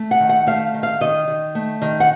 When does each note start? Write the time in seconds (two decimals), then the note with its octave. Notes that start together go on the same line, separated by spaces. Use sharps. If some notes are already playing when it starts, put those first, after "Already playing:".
Already playing: A3
0.11 F#5
0.20 D#3
0.29 F#5
0.47 A3 F5
0.74 D#3
0.83 F5
1.01 D#3 D#5
1.28 D#3
1.55 A3
1.82 D#3
2.00 F#5